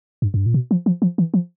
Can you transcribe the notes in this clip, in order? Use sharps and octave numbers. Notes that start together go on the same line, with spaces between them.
G2
F#2
G2
A#2
B2
F3
F3
F3
E3
F3